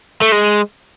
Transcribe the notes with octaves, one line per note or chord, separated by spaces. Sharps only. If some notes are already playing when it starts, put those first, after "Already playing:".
A3
G#3